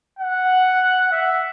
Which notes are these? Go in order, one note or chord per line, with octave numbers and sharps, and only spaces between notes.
F#5
E5